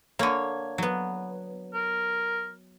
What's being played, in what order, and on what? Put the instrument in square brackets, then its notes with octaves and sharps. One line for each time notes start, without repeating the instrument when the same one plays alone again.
[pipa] D3 C#5 [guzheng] A#3
[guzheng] F#3 B3
[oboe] A#4